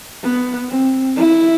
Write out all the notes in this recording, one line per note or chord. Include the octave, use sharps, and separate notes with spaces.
B3
C4
E4